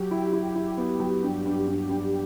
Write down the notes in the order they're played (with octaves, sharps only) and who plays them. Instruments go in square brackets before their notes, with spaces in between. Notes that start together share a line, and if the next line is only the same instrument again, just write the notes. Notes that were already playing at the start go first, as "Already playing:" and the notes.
Already playing: [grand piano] F#3 [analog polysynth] G4
[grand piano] E4
E4
E4
B3
F#3
G2
G2
G2
G2